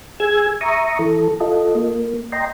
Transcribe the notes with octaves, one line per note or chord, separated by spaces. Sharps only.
G#4 G#5 E6 G#6
E5 A#5 C#6 D#6
E3 A4
F4 A4 D#5
A#3
D#5 G5 A#5 C6